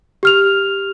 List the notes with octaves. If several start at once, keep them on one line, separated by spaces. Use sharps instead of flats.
G4 F6 F7